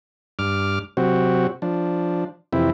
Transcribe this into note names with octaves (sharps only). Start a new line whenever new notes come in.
G2 D6 F6
C3 F#3 C4 F#4
F3 D4
F2 C3 E3 C4 E4